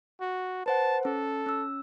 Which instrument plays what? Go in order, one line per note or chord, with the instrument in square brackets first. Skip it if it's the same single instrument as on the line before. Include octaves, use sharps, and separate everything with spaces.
[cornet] F#4
[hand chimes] B4 C5 F#5 [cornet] A5
[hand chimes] C#4 [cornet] A4
[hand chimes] C#4 E6